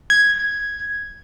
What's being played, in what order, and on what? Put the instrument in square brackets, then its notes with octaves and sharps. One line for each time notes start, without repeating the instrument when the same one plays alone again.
[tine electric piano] G#6